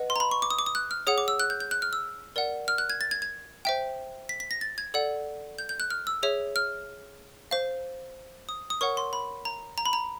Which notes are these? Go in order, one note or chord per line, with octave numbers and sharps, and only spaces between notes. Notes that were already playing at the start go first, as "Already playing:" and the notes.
Already playing: B4 D#5 F#5
C6
A#5
B5
C#6
D6
D#6
D6
D#6
F#6
F6
G#4 C#5 F#5 D#6
D6
E6
F#6
G6
G6
F#6
F6
E6
A#4 D5 F#5
F6
F#6
G#6
A6
G#6
G#6
C5 E5 G5
B6
B6
A#6
A6
G#6
A4 D5 F#5
G6
G6
F#6
F6
E6
G#4 C#5 E5
F6
C5 F5
D#6
D#6
A#4 C#5 F#5 C#6
C6
B5
A#5
A#5
B5
A#5